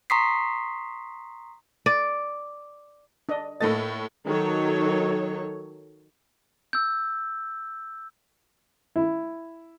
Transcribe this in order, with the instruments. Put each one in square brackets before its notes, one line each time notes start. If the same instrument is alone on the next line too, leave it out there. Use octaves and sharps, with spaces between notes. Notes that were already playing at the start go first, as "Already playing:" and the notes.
[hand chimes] A#5 C6 C#6 D#6 B6 C7
[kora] D5
[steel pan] D4 D#5
[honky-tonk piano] A2 A3 A6 [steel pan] A#3 A4 D#5
[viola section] D#3 F#3 A4 C#5
[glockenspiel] E6 G6
[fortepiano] E4